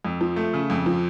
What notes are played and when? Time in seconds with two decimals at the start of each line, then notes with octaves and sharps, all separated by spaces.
0.05 F2
0.21 F3
0.36 A3
0.53 C#3
0.70 F2
0.86 F3